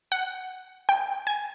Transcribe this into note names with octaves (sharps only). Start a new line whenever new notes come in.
F#5
G5
G#5